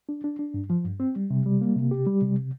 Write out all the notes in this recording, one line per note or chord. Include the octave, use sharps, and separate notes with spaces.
D4
D4
D4
G2
F3
G2
C4
G3
C3
G3
A#3
C3
G4
G3
C3